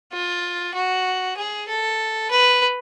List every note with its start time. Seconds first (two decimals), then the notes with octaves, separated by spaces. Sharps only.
0.12 F4
0.74 F#4
1.37 G#4
1.68 A4
2.31 B4